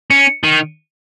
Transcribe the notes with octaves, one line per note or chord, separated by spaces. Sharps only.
C#4
D#3